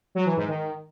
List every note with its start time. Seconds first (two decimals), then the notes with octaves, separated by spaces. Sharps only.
0.15 F#3
0.26 E3
0.37 G#2
0.48 D#3